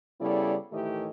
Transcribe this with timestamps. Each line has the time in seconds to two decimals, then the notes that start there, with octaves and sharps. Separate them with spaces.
0.20 C#3 G3 B3 E4 A4 D5
0.72 A2 D#3 E3 A3 G4 D#5